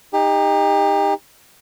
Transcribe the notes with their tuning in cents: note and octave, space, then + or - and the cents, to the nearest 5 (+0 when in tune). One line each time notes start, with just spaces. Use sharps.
D#4 +0 G4 +35